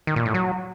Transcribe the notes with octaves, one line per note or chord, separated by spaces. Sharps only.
D#3
A#2
A2
F#3